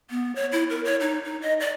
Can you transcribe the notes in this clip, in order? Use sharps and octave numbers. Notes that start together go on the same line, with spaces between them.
B3
C#5
E4
A#4
C#5
D#4
D#4
D#5
D5